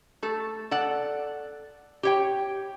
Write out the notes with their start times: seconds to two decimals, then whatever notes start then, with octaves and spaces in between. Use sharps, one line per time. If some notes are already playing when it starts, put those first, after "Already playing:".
0.23 A3 A4
0.71 A4 D5 F#5
2.03 G4 C#5 G5